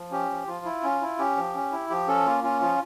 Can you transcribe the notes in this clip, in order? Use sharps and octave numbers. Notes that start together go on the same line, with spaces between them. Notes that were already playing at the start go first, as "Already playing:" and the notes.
Already playing: F3
C#4 G4
F3
F3 F4
E4
C#4
E4
C#4 G4
F3
C#4
E4
F3 G4
C#4 A4
A#3 F4
C#4 F4
F3 F4